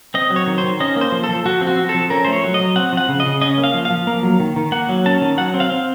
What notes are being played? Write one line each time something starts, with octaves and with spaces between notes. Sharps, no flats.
C4 D#5
F#3
C#5
D#3
C5
D#3
C#4 D#5
A#3 C5
F3
A4
F3
F3 F#4
C4
F#4
C4
A4
F3
C#4 A#4
A3 C5
C#5
F#3
D#5
F#3
C4 F#5
F3 F#5
C#3
D#5
C#3
C#4 D#5
A#3
F5
F3
F5
F3
A#3
F#3
D#3
D#3
A#3 F#5
F#3
C#4 A5
D#3
F#3 F#5
C4
F5
C4